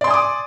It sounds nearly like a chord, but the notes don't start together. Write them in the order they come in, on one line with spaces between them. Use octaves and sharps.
D5 C6 G#5 D#6 D6